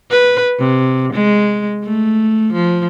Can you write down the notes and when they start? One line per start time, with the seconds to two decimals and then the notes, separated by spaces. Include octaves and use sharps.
0.11 B4
0.59 C3
1.13 G#3
1.84 A3
2.52 F3